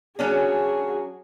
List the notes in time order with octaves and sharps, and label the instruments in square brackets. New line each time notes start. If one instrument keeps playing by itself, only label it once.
[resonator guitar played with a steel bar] F#3 C#4 D4 [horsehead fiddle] F#4 G#4